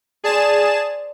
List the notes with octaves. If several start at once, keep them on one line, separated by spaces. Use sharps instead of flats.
G#4 C5 D5 A5 E7